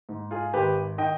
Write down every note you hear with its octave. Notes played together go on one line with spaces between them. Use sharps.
G#2
F4 G#4
G#1 G4 B4
D#3 D#5 G5